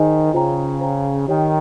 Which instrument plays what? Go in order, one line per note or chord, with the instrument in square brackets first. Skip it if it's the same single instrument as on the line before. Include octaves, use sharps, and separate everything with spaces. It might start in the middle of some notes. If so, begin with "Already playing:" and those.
Already playing: [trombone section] D#3 [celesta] D#4 G#4 C5 D#5 G#5
[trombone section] C#3 [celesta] F4 C5 G5 A#5
[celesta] C5 G5 A#5
[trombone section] D#3 [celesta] G4 C#5 G5